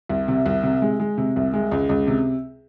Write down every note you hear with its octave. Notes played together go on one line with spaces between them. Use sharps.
C2
C3
C2
C3
G#3
G#3
C3
C2
G#3
C#2
C#2
C3